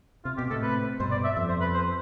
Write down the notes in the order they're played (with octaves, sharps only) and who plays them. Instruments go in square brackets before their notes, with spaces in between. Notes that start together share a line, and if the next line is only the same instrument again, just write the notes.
[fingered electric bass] C3 [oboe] F4
[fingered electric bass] B2 [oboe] G4
[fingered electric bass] A2 C3 [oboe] A4
[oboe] B4
[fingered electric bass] G2 B2 [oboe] C5
[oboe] D5
E5
[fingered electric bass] F2 [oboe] E5
[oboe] C5
B4
C5